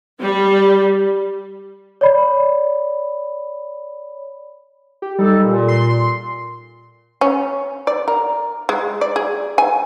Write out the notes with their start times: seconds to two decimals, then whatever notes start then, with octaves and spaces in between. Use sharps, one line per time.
0.21 G3
2.01 C#5 D5 B5
5.02 G4
5.19 G3 D#4 A4
5.44 A#2
5.68 C6
7.21 C#4
7.87 D5
8.08 A#4
8.69 G#3
9.01 D5
9.16 G#4
9.58 G#5